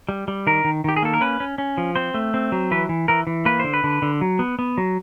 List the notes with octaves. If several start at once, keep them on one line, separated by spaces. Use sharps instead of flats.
G3
G3
D#3 A#4
D#3
D#3 G4
G#4
A#3 A4
A#4
C#4 B4
C#4
C#4
F3
C4 C5
A3
C4
F#3
E3 B4
E3
E3 A#4
E3
A#3 B4
D3 C5
B4
D3
D3
F#3
B3
B3
F#3